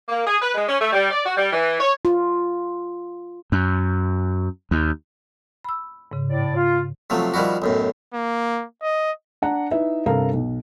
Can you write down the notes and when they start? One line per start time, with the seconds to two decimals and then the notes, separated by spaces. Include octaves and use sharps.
0.09 A#3
0.25 G#4
0.40 B4
0.54 G#3
0.68 C#4
0.80 A3
0.93 G3
1.11 D5
1.25 F#4
1.37 G3
1.51 E3
1.80 C#5
2.05 F4
3.52 F#2
4.71 D#2
5.64 B5 E6
6.11 G#2 C#3
6.28 A2 D5
6.56 F4
7.10 C3 F3 F#3 A3
7.34 D#3 F3 G3 E4 F#4
7.62 B1 F#2 A2
8.14 A#3
8.83 D#5
9.42 D4 F#5 A#5
9.71 D#4 E4 B4 E5
10.06 G2 C3 A4 A#4 F5 A#5
10.33 B1